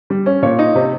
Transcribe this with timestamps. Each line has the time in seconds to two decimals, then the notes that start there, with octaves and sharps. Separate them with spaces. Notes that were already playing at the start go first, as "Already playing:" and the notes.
0.10 G3
0.26 C#4
0.42 A#2 C#5
0.59 D#4
0.75 C3